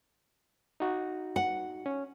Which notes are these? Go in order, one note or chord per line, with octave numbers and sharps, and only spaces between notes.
D#4 F#4
F#5
C#4